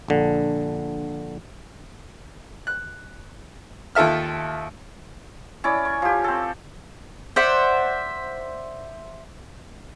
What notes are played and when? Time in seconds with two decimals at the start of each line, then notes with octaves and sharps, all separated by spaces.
0.08 A#1 D3
2.67 F#6
3.95 D#2 F4 A4 E5 F6
5.64 C#4 E4 D5
5.85 C#6
6.02 F3 G4
6.24 C4 A4
7.36 C5 D5 E5 F#5